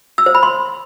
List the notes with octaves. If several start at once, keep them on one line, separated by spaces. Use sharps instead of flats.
E6
C5
B5
C6